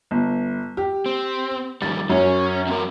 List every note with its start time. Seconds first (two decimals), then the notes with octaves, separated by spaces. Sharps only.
0.11 G1
0.77 G4
1.06 C4
1.82 F2 D#3 G3 A6
2.10 F#2 C#4 C#5
2.67 F#3 C4 A#4